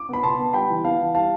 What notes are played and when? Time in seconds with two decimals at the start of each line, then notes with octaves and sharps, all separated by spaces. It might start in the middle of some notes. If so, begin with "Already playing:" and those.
Already playing: D6
0.09 B3 B5
0.23 B2 A5 C6
0.39 B3
0.53 G3 G5 B5
0.69 E3
0.85 B3 F5 A5
0.99 E3
1.15 G3 F5 A5